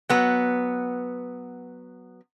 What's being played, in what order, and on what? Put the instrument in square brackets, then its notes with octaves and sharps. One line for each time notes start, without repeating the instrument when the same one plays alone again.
[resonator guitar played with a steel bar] F#3 B3